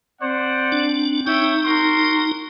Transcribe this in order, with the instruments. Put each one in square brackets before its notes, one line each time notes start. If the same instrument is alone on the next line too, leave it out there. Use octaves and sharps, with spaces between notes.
[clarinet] C4 [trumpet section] C5 D5 F#5
[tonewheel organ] D4
[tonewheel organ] D#4 [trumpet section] C#5 E5 G5
[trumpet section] F#4 A#4 C6